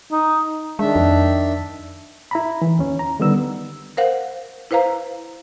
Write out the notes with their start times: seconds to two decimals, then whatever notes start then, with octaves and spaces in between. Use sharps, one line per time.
0.12 D#4
0.79 D#3 G#3 D4 E5
0.96 F2
2.31 E4 A#5 B5
2.62 E3
2.79 D#2 C#4
2.99 A#5
3.20 D3 D#3 G3 B3 D4 E6
3.97 A#4 C5 F5 F#5
4.71 E4 B4 C5 F5 A#5